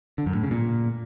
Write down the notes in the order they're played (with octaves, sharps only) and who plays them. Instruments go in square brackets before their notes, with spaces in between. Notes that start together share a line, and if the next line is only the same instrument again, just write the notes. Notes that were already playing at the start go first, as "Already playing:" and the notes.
[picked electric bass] D3
F#2
A2
C#3
A#2